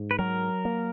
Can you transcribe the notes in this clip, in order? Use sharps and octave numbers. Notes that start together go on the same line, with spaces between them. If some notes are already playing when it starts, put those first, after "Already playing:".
Already playing: G#2
B4
F#3 A#4
A#3